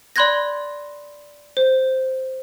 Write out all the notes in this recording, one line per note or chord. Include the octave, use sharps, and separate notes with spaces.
D5 B5 C6 F#6 G#6 A#6
C5